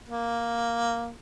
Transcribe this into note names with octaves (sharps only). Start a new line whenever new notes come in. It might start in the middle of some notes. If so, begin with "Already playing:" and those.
A#3